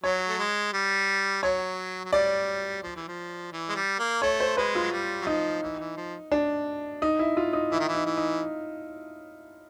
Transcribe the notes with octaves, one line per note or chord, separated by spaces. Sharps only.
F#3 C#5
A3
G#3
G3
F#3 C#5
F#3
G3 D5
F3
E3
F3
E3
G#3
G3
A#3
A3 C#5
C5
G#3 B4
F4
F#3
G3
F#3
F3 D#4
E3
E3
F3
D4
D#4
E4
F4
D#4
E3 E4
D#3
E3
D#4
E3
D#4